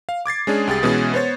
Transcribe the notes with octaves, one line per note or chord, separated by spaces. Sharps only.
F5
D6 G#6 A6 C7
G#3 C#4 D4 G#4
C2 G4 G#4 A6
B2 E3 G#3 B3 C#4 G#4
B3 C5 C#5 A6